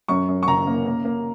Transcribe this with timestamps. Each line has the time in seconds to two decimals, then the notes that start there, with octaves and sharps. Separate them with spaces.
0.08 F#2 C#6
0.28 F#2
0.43 C#6
0.47 F#1 A#5
0.67 A#3
0.86 A#3
1.05 A#3